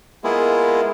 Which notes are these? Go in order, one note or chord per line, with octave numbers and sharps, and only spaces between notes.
G#3 A#3 B3 E4 F4 G#4